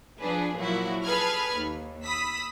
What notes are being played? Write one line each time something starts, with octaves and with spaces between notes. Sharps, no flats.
F3 D4 G#4 B4
A#2 F3 F#3 E4 F#4
G#4 A4 B4 B5 F6 G#6
D#2
B5 D#6 E6 B6